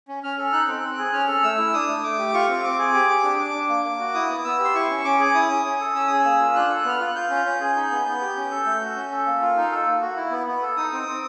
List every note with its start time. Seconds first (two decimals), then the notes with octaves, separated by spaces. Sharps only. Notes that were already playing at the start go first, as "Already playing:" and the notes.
0.08 C#4
0.23 C#4 F6
0.38 A4
0.52 D#4 F#6
0.68 C4
0.83 C4
0.98 G#4
1.13 C#4 F6
1.28 A4
1.43 A3 E6
1.58 E4
1.73 D4 D#6
1.89 A3
2.03 A3 D6
2.19 G4
2.34 F4 C#6
2.49 C4
2.64 C4 D6
2.78 G#4
2.94 G4
3.09 G4
3.24 D4
3.39 D4
3.54 D4
3.69 A#3
3.84 A#3
3.99 F#4
4.14 E4 D#6
4.29 B3
4.45 B3 E6
4.59 G4
4.65 C6
4.75 E4 C#6
4.90 C#4
5.05 C#4 D6
5.20 G#4
5.34 E4 D#6
5.50 C#4
5.65 C#4
5.80 A4
5.95 C#4 E6
6.07 G#4 D#6
6.19 E6
6.25 A#3
6.40 F4
6.55 D4 F#6
6.70 A4
6.85 B3 F6
7.00 F4 F#6
7.15 F4 G6
7.30 C#4
7.46 C#4
7.60 G#4
7.76 D#4
7.91 B3
8.06 B3
8.21 G4
8.36 C#4
8.51 A4
8.66 A3
8.82 F#4
8.96 C#4
9.12 A4
9.26 A#3
9.41 F4
9.56 D#4
9.72 A4
9.86 A#3
10.01 F#4
10.16 E4
10.31 B3
10.47 B3
10.62 A4
10.77 D#4 D#6
10.92 C4
11.07 C4